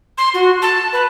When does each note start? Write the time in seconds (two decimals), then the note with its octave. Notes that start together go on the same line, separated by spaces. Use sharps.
0.18 C6
0.34 F#4
0.62 A5
0.93 B4